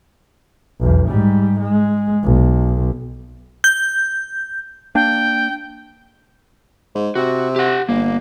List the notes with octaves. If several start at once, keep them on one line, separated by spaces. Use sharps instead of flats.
B1 E2
G#2 G3
G#3
B1
G6
A#3 D4 G5
G#2
C3 F#4
G4 F#5
G1 A#3